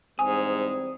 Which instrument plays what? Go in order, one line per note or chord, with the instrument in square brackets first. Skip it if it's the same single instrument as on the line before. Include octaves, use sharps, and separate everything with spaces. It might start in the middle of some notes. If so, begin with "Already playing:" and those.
[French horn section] E2 G3 C4 [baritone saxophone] G#2 [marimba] G#5 [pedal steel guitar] D#6